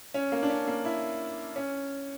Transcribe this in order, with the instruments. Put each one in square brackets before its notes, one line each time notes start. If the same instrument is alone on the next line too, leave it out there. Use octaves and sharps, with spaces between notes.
[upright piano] C#4
A#3
D4
C#4
A#3
E4
C#4